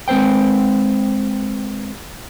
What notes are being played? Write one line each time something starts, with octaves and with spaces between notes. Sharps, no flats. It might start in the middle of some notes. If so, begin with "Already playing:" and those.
G#3 C4 B4 C5 G5